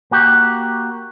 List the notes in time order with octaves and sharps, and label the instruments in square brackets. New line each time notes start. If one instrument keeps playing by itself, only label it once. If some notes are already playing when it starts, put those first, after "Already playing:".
[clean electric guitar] A#3 F#4 G4